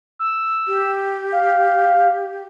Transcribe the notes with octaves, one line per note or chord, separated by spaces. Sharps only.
E6
G4
F5